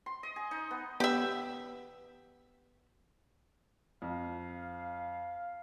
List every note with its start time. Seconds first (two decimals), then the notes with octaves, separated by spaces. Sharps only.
0.06 C6
0.23 D#5
0.36 G#4
0.51 D#4
0.71 B3
1.00 B3 G4 E5
4.02 F2 F5